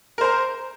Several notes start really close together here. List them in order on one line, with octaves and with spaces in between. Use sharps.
A#4 C5 A#5